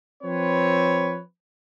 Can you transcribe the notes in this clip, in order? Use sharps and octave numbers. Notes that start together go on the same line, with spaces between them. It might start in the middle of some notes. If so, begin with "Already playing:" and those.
F3 C4 B4 C#5